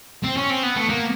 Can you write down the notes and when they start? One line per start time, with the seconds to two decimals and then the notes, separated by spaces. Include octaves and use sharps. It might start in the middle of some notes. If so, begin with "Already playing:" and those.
0.24 C4
0.37 C#4
0.50 C4
0.63 B3
0.76 A3
0.90 A#3